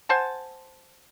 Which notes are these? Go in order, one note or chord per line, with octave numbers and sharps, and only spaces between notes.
C5 F#5 G#5 A5